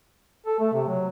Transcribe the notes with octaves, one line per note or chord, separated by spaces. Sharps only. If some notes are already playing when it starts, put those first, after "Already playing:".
A4
A3
C3
F#3